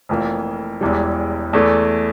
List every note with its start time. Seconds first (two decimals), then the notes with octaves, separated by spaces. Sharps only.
0.09 F1 F2 E3 A#3
0.81 E1 E2 E3 G3
1.53 E2 E3 A3